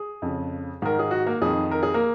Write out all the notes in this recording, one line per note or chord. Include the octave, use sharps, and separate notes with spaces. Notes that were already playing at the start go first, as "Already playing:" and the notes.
Already playing: G#4
F2 C#3
G#2 D#3 A#4
G#4
F#4
A#3 A#4
F2 D#3 G#4
A#4
G#4
A#3 A#4